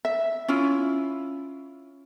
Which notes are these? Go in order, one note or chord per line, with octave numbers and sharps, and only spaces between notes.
E5
C#4 E4 F4